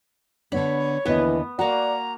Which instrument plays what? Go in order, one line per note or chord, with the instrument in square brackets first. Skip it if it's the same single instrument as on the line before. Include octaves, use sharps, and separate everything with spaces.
[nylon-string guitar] D3 B3 D4 [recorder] C#5 [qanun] B5
[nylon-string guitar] D#2 D3 D#5 [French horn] E3 [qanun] B3 B4
[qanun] A#3 F#4 [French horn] D5 [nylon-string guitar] F#5 [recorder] A#5